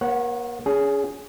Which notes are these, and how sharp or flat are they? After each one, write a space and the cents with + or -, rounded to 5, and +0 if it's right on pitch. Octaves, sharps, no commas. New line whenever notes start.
A#3 +35 C#5 -30 F#5 +0
C#4 +35 G#4 +0